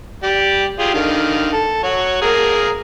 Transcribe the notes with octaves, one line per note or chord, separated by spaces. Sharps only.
G4 D5
F4 G4 G#4
D3 D#3 F5
A4
F#4 C#5
A#3 G#4 A#4